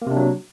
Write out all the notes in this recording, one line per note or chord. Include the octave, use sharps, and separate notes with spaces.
C3 F#3 A#3 D4